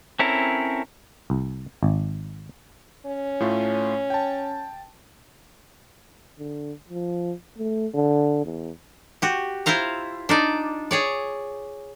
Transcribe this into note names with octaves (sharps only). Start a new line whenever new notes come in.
C4 C#4 E4 A4 A#4
C2
G#1
C#4
A2 A3 F4
G5 A5
D3
F3
A3
D3
E2
F#4 G4
E4 F4 C5 F5 A#5
D4 D#4 D5
G#4 C#5 D5